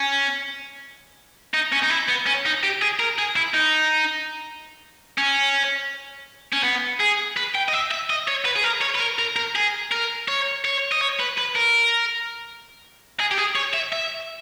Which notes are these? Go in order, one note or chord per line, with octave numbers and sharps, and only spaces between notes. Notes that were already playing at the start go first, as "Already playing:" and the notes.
Already playing: C#4
D#4
C#4
D#4
E4
B3
C#4
D#4
G4
G#4
A#4
G#4
E4
D#4
C#4
C#4
B3
G#4
B4
G5
D#5
E5
E5
D#5
C#5
B4
G#4
A#4
C#5
B4
A#4
A#4
A#4
G#4
A#4
C#5
C#5
D#5
C#5
B4
B4
A#4
G#4
G4
G#4
C#5
E5
E5